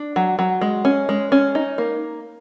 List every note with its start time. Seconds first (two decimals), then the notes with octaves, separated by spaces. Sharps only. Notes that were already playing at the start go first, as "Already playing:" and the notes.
Already playing: D4
0.16 F#3
0.39 F#3
0.61 G#3
0.85 C#4
1.09 G#3
1.32 C#4
1.55 D#4
1.78 A#3